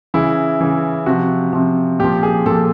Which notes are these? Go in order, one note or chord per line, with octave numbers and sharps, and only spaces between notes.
C#3 E3 E4
C#3 E3
C3 F3 F#4
C3 F3
A#2 F3 G4
G#4
A#2 F3 A4